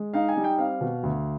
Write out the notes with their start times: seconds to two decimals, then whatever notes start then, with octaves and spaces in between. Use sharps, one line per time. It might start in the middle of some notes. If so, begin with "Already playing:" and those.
Already playing: G#3
0.14 D#4 F5
0.29 G#5
0.37 G3
0.44 G5
0.58 C4 F5
0.81 B2
1.03 D2